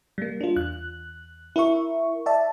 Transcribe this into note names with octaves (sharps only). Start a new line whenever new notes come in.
G3 A#3
D4 F4
E2 F#6
E4 A#4 E5 C#6
D5 E5 A5